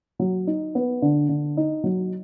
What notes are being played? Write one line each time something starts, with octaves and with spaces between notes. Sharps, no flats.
F#3
D#4
B3
D3
D3
D#4
F#3